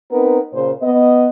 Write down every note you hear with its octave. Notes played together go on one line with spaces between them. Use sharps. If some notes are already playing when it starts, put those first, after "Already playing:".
B3 C4 D#4 A#4 B4
A#2 C#3 C5
B3 D#5